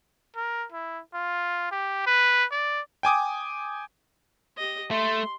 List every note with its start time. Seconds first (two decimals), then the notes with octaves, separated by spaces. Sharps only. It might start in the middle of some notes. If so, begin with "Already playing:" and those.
0.36 A#4
0.72 E4
1.14 F4
1.72 G4
2.07 B4
2.51 D5
3.03 G5 G#5 D6 D#6
4.58 G4 D#5
4.91 A3 C6